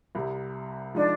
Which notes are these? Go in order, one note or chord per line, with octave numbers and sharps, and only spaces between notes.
C2 C3 G3
F3 G#3 D4 D#4 D5